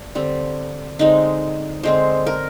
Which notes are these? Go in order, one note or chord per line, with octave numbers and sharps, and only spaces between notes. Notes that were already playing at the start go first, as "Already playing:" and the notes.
Already playing: D4
D3 G3 C4
D3 G#3 C4 D#4
D3 G#3 C4 C5
A#4